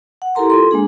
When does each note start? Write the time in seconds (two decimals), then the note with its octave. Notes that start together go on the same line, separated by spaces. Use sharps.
0.22 F#5
0.35 E4 G4 A4 A#4 A#5 C6
0.50 F4 A4 C6
0.71 G#3 A#3 D4 G#4